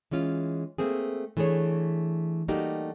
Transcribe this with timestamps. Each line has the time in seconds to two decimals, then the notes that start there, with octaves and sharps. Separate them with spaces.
0.11 E3 G#3 C#4 F4
0.78 A3 A#3 C4 G#4
1.37 E3 A3 D4 G#4 C#5
2.48 G3 A3 A#3 D#4 F#4 G4